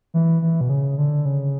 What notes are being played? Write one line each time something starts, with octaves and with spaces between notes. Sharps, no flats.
E3
E3
B2
C#3
D3
C#3